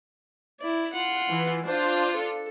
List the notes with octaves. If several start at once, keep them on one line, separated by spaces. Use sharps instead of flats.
E4 D5
F4 F#5
E3
D4 F4 C5
A4